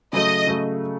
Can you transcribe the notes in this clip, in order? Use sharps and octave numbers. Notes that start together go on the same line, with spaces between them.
C#3 F#3 A3 D#5
C#3 F#3 A3